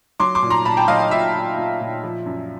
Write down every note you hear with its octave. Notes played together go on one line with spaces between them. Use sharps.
F#3 C6 D6
C6 D6
A#2
A#5 C6
A#2 A5 B5
G5 A5
F#3 D#5 F5
D#5
A#2 E5
A#2
A#2
A#2
F3
F#2